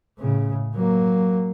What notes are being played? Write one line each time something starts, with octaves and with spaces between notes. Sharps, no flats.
A2 C#3
F#3 A#3